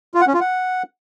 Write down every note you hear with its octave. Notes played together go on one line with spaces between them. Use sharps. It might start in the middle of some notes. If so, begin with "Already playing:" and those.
F4
F#5
C#4
F4
F#5